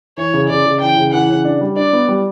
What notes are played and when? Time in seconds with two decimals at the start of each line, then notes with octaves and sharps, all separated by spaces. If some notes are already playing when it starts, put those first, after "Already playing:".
0.17 E3 C#5
0.34 C#3
0.49 C#3 D5
0.66 C#3
0.81 E3 G5
0.97 C#3
1.13 E3 F#5
1.30 C#3
1.45 D4
1.61 G3
1.76 D4 D5
1.93 B3
2.09 G3